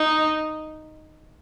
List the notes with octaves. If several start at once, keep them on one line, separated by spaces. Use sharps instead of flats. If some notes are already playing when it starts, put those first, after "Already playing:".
Already playing: D#4